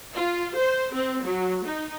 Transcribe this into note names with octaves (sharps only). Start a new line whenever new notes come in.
F4
C5
C4
F#3
D#4